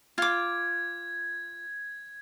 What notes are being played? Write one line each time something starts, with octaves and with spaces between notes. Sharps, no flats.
F4 D6 G#6